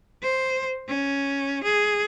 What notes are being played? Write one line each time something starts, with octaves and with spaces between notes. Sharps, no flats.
C5
C#4
G#4